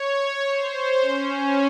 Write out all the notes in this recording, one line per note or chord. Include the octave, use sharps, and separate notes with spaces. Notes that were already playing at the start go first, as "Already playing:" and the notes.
Already playing: C#5
C#5
C5
C#4